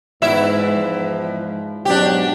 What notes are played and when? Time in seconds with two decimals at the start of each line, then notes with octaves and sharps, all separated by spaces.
0.22 E2 G#2 E4 E5
0.66 G#2 F3
1.85 G#2 B2 F#3 D4 G4